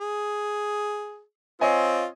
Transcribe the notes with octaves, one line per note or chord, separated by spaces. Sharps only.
G#4
C4 F4 C#5 D#5 G#5